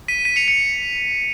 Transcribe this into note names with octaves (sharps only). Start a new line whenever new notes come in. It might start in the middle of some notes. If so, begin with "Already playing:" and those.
B6 D#7
B6 D#7
C#7 F7
C#7 F7